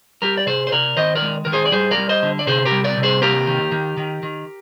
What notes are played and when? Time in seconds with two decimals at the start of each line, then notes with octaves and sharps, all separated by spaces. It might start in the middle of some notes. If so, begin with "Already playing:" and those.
0.22 G3 G4 A#4
0.38 D5
0.47 C3 G#4 C5
0.67 C5
0.72 C3 A#4 D5
0.97 D#3 C5 D#5
1.15 A#4 D5
1.22 G#3
1.45 D#3 A#4
1.53 G#4 C5
1.66 D5
1.72 G3 G#4 C5
1.91 A#4 D5
1.98 G3
2.09 C5 D#5
2.23 D3
2.39 D5
2.47 C3 G#4 C5
2.66 G4 A#4
2.72 G3
2.84 A#4 D5
2.97 C3
3.03 G#4 C5
3.22 A#3 G4 A#4
3.47 D#3
3.72 D#3
3.97 D#3
4.23 D#3